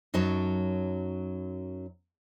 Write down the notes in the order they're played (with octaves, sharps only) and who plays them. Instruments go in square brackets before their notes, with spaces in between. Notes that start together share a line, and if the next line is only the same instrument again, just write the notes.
[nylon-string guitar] F#2 F#3 D#4 C#5 A5